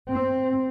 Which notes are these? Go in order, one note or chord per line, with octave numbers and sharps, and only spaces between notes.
C4